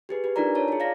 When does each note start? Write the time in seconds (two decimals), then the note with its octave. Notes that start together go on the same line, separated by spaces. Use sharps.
0.09 G4 G#4 B4
0.24 G4 B4
0.36 D4 D#4 F4 A#4 D5 A#5
0.55 C#5 A5 A#5
0.68 F4 G#4
0.80 D5 F5 A#6